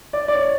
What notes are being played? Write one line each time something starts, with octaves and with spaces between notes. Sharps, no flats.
D5
D5
C#5